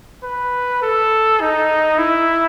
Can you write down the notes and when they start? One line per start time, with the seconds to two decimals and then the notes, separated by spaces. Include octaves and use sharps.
0.23 B4
0.82 A4
1.41 D#4
1.98 E4